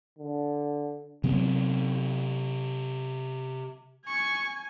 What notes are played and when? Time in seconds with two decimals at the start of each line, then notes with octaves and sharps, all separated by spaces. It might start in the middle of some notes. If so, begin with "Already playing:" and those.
0.19 D3
1.24 C3 F#3 B3 C4
4.08 G#5 C#6